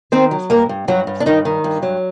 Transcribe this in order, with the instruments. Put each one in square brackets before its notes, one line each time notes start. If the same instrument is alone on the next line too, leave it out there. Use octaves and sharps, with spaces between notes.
[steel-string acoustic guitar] D#3 C4 C5
F#3
G2 A#3 A#4
G2
G2 F#3 F#4
G2
D4
G2 D#3 D#4
D#3
G2
F#3